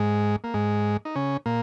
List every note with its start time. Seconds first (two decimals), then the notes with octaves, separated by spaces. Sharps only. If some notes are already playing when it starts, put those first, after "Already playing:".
Already playing: G#2 G#3
0.44 A#3
0.54 G#2 G#3
1.05 D#4
1.16 C#3 C#4
1.46 A#2 A#3